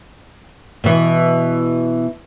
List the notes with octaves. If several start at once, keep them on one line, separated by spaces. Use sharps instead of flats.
B2 E3